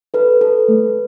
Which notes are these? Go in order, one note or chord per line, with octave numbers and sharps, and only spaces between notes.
A4 B4
A4
A3